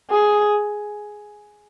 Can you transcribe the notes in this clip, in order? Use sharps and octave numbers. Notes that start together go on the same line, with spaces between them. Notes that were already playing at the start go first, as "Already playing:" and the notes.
G#4